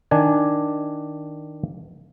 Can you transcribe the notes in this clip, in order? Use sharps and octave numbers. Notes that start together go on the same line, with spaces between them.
D#3 D4 G#5